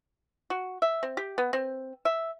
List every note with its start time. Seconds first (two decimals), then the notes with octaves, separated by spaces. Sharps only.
0.50 F#4
0.82 E5
1.03 C4
1.17 G4
1.38 B3
1.53 C4
2.05 E5